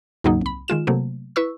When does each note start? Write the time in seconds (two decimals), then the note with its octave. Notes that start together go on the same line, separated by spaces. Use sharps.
0.24 D#2 G#2 C#3 F#3 A#3 D#4
0.41 C2 B5
0.68 D#3 G#3 F4 E7
0.87 C3 F#3 A3 A#3
1.36 E4 B4 C#6 E6